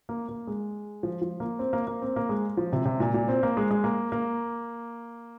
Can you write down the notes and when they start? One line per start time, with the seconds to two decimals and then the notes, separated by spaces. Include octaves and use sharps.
0.09 A#3
0.28 A#3
0.47 G#3
1.03 F3
1.22 F3
1.40 A#3
1.59 C4
1.73 A#3
1.87 A#3
2.02 C4
2.16 A#3
2.29 G#3
2.57 F3
2.73 C3
2.85 C3
3.00 A#2
3.14 A#2
3.28 C4
3.43 A#3
3.57 G#3
3.71 G#3
3.84 A#3
4.12 A#3